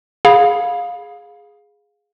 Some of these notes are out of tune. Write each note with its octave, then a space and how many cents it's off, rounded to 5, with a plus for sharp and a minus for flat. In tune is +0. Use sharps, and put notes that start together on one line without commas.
G#4 +0 F5 +20 B5 -10